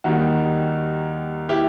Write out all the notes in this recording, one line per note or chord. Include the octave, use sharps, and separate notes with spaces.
D#2 D#3 G3 D#4 F#4
E4 G4